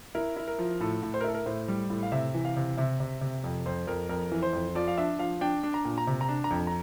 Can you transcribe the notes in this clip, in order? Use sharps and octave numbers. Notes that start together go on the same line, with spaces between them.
E4 A#4
E4
A#4
F3
A2 A4
A2
C5
A#4
E4 A4
A#4
A2 C5
G3
A2
F5
C3 E5
E3
F5
C3
C3 E5
C3
C3
F2
F2 C5
F2 A#4
F2 A#4
E3
C5
F2
F3 D5
F5
D4 E5
F3 F5
D4 G5
D4
A#5
A#2
A#5
C3
A#5
D4
A#5
F2
A#5